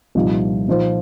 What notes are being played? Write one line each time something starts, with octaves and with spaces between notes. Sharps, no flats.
C2 A#2 F3 D#4
A#2 F3 D#4 C5